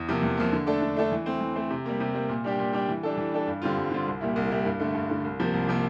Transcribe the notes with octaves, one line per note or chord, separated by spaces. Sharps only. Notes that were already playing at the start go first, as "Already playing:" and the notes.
Already playing: E2
C3 F3 A#3
E2
C3 F3 A#3
D3
A3 D4 A4
D3
A3 D4 A4
E3
A3 C4
E3
A3 C4
C3
G3 A#3
C3
G3 A#3
A#2
G3 D4 G4
A#2
G3 D4 G4
E3
G3 D4 A4
E3
G3 D4 A4
G2
D3 G3 C4 F4
G2
D3 G3 C4 F4
C2
A#2 G3 A#3 E4
C2
A#2 G3 A#3 E4
G2
D3 A3
G2
D3 A3
C2
C3 F3 A#3
C2
C3 F3 A#3